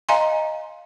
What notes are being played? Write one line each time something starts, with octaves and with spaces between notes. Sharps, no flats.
D#5 F5 G#5 A#5 C6